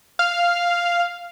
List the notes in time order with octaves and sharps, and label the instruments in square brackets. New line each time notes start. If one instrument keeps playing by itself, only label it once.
[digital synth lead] F5